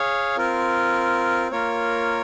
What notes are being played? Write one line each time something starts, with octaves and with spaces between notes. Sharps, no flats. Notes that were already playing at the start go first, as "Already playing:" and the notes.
Already playing: G#4 C#5 F5
C4 F4 A#4
A#3 F4 A#4 C#5